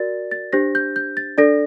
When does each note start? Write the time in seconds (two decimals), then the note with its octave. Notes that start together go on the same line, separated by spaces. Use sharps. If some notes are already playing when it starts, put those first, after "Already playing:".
Already playing: F#4 A#4 D5 A6
0.31 A6
0.53 D4 G4 C5 A#6
0.75 G6
0.96 G6
1.17 A6
1.38 D4 A4 D5 A#6